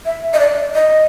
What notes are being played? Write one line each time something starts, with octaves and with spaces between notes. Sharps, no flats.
E5
D#5
D5
D#5